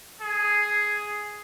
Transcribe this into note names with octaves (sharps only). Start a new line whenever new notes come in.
G#4